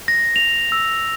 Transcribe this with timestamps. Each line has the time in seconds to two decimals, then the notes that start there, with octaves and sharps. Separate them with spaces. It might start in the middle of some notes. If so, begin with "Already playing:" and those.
0.08 A#6
0.36 F7
0.72 E6